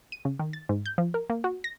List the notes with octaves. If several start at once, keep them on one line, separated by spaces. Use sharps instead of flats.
D#7
C#3
D#3
A6
G#2
G6
F3
A#4
A#3
F#4
A#6